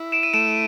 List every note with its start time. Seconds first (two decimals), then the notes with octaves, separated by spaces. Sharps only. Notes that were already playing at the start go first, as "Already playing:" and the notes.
Already playing: E4
0.12 D7 E7
0.23 D#7
0.33 A3 D7 E7